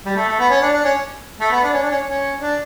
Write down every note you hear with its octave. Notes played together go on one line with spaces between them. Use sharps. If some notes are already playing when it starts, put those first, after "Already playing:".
G3
A3
A3
B3
C#4
D4
D4
C#4
A3
B3
D4
C#4
D4
C#4
C#4
D4